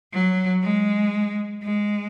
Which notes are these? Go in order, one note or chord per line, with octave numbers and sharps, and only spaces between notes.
F#3
G#3
G#3